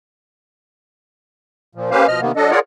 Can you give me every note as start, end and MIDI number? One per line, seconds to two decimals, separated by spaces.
1.75 1.90 46
1.75 1.90 53
1.91 2.07 58
1.91 2.07 61
1.91 2.07 67
1.91 2.07 71
1.91 2.07 72
1.91 2.07 77
2.08 2.21 47
2.08 2.21 53
2.08 2.21 75
2.08 2.21 89
2.21 2.32 48
2.21 2.32 51
2.21 2.32 58
2.21 2.32 59
2.36 2.51 54
2.36 2.51 62
2.36 2.51 69
2.36 2.51 75
2.51 2.59 65
2.51 2.59 68
2.51 2.59 70
2.51 2.59 73
2.51 2.59 74
2.51 2.59 78